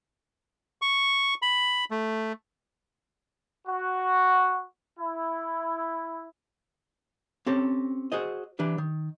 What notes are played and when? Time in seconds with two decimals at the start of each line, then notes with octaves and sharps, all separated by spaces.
0.82 C#6
1.42 B5
1.91 A3
3.67 F#4
4.99 E4
7.47 C4 C#4 G4 A4
8.12 F#4 G#4 C5 D#5
8.59 E3 D4 G4 B4
8.78 D#3